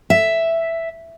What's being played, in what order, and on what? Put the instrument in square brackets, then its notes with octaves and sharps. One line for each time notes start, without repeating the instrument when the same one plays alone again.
[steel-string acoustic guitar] E5